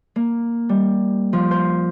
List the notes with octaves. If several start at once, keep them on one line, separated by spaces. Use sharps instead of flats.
A#3
G3
F3
C5